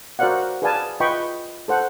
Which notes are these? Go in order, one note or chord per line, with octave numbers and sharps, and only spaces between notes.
F#4 A#4 C5 D5 F5 F#5
G#4 B4 D5 F5 G#5 A5
F4 B4 D#5 G5 B5 C#6
A4 C5 F#5